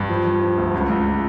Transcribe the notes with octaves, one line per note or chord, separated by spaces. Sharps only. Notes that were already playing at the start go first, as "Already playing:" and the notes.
Already playing: G2
F3
F3
F3
D2
C#2
C#2